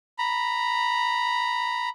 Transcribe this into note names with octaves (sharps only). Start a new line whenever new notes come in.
A#5 B5